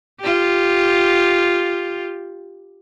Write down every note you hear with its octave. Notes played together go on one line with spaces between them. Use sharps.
F4 G4